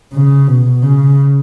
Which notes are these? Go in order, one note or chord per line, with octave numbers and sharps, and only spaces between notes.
C#3
B2
C#3